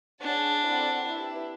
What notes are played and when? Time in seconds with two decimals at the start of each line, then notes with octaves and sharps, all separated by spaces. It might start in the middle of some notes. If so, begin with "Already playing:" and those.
0.21 D4 G#4 C#5 F#5 A5
0.63 C4 E4 A4 D5 F#5
1.05 E4 G4 B4 E5